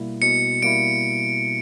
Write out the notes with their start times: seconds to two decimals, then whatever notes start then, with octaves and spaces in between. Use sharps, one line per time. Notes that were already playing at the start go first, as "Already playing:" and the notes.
Already playing: B2 G3 A#3 E4
0.22 B2 C#7
0.62 G3 A#3 E4 D7